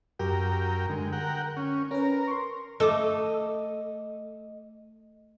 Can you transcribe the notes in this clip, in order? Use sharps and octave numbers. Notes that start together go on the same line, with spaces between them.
F#2 G4 A#4 G5
D3 G#3
A#4 F#5 G5
C#4
C#4 A#4 B4
C6 C#6
A3 A4 D#5 D6